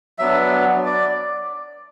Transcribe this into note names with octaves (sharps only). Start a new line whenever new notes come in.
F#3 B3 D4 E5
D5